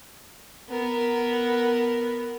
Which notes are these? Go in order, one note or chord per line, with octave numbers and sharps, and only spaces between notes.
B3 A#4